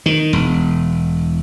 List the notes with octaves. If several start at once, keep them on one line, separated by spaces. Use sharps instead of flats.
D#3
E1